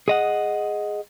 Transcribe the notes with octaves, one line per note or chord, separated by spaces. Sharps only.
G#4 D#5 F#5